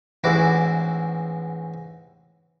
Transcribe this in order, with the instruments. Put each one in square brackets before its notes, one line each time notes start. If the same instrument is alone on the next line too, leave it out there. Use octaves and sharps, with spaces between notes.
[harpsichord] A1 E2 G#2 E4 F#4 D6